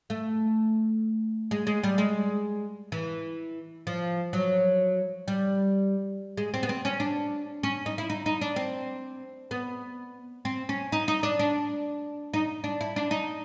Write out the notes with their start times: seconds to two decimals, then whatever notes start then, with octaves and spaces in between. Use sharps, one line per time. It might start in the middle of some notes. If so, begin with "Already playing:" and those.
0.10 A3
1.51 G#3
1.67 G#3
1.84 G3
1.98 G#3
2.92 E3
3.87 F3
4.33 F#3
5.28 G3
6.37 G#3
6.54 C4
6.63 B3
6.69 C4
6.85 C#4
7.00 D4
7.63 C#4
7.86 D#4
7.98 E4
8.10 D#4
8.26 D#4
8.41 D4
8.56 C4
9.51 B3
10.45 C4
10.69 C#4
10.92 D#4
11.08 D#4
11.23 D4
11.39 D4
12.34 D#4
12.64 D4
12.81 E4
12.96 D4
13.11 D#4